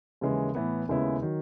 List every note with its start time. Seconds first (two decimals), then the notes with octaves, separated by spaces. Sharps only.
0.21 D#2 C#3 E3 G#3
0.55 A2 E3 B3
0.89 D#2 C#3 G#3 B3 E4
1.22 D#3 F#3